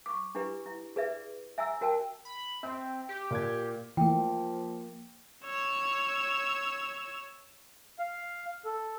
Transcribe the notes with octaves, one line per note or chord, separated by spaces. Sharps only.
C#6 D6
D4 E4 G4 B4
E4
G#4 B4 D5 E5
E5 G#5 A#5 E6
F#4 A#4 G5 A5
B5
C4 E5
G4
A#2 G#6
E3 F3 A3 A#3 G5
C#5 E6
F5
A4